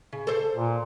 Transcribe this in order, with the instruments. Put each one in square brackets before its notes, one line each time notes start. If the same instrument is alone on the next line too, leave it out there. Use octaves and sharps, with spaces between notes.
[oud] C#3
A4 C5
[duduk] A#2